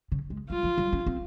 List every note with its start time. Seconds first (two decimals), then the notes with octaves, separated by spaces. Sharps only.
0.12 C#3
0.30 G#3
0.50 G3 F4
0.63 F3
0.78 G3
0.93 C#4
1.07 C4